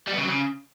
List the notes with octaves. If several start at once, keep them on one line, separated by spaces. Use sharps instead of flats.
G3
B3
C#3
F#3
C#3